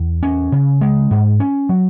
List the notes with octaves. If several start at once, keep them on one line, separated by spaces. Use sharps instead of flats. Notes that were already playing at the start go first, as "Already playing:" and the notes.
Already playing: E2
C#4
C#3
G#3
G#2
C#4
F#3